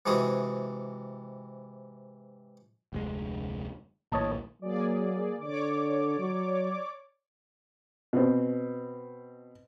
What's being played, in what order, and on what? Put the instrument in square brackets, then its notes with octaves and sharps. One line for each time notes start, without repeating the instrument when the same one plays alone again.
[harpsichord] G#2 C3 E3 F#4 G#4 D#6
[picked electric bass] F1 D2 G#3
[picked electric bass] A#1 D#2 A2 [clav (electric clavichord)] C#5 D#5 A5
[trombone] F#3 [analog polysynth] A#3 G#4 D5
[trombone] D3 [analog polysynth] C#5 D5 D6
[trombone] F#3
[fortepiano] B2 C4